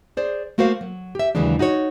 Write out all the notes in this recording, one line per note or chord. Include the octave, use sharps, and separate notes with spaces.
G#4 C5 D5
A3 A#3 F#4 A#4 C5 F5
F#3
G4 E5
D#2 C#3 E3 F#3 G#3 D4
D#4 F#4 G#4 C#5